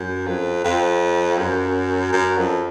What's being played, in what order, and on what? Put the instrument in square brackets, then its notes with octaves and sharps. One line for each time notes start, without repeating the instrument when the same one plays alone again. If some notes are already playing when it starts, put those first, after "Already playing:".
Already playing: [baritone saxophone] F#2
F2
F2
F#2
F#2
F2